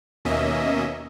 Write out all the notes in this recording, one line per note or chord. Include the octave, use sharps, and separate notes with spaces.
D#2 B2 A#3 C#4 D#5 E5